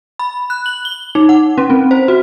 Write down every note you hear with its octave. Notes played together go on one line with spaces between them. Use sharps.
B5
F#6
F#7
G7
D#4
F#5
C#4
C4
C5
F#4